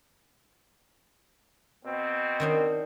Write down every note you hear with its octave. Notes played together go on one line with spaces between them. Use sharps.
B2 C4
D#3 C#4 D4